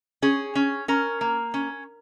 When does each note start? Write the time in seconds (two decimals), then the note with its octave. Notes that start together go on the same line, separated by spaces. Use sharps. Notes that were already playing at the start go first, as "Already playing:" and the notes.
0.22 C#4 G#4
0.55 C#4
0.88 C#4 A#4
1.21 A#3
1.54 C#4